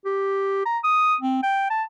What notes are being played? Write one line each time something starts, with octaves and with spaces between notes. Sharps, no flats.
G4
A#5
D#6
C4
G5
A5